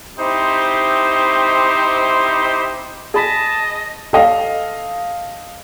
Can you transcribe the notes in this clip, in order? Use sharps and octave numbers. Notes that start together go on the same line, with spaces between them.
C4 D#4 E4 G4 C5
G#4 D#5 A5 B5 B6
A4 D#5 F5